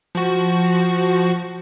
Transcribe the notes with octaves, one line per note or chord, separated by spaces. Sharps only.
F3 F#4